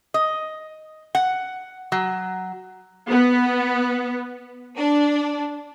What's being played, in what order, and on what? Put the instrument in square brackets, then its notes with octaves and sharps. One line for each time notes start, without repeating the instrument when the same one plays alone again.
[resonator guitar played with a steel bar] D#5
F#5
F#3
[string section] B3
D4